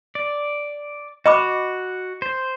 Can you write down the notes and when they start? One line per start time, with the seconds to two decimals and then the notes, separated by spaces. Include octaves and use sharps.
0.15 D5
1.26 F#4 D#5 B5 D6
2.22 C5